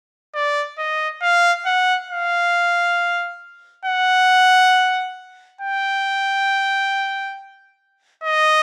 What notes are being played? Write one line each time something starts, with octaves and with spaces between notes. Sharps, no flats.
D5
D#5
F5
F#5
F5
F#5
G5
D#5